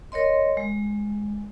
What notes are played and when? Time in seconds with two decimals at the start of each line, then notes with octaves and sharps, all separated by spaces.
0.12 A#4 C#5 D#5 C6
0.57 G#3